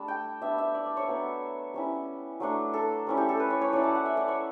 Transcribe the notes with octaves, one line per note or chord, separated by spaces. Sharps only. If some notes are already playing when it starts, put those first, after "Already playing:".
Already playing: G3 A3 D4 A5 B5
G5
G3 B3 D4 E5
E5
D5
D5
C#5
F#3 B3 D4
G3 C#4 E4
F#3 A3 D4
A4
G3 C#4 E4
G4
A4
B4
C#5
C#5
F#3 C#4 E4 D5
A5
F#5
E5
D5
C#5